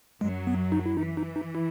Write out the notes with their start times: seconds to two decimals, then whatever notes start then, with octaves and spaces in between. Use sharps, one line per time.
0.21 F#2 F#3 G#3
0.47 B3
0.72 D#4
0.86 E4
0.97 E3 D#4
1.17 D#4
1.36 D#4
1.55 E4